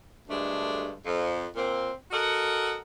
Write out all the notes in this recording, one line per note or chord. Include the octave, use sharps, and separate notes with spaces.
D2 G2 G#3 A3 D4
F2
A#2 A#3 C4
F#4 A4 A#4 D#5 F#5